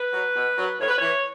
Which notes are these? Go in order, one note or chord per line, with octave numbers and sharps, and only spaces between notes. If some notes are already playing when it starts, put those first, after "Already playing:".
Already playing: B4
F#3
B2
F#3
A2 C#5
B4
C#5
E3